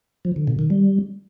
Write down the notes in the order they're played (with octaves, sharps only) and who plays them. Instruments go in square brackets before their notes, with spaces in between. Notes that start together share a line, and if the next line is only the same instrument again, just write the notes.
[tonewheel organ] F3
D3
B2
D#3
G3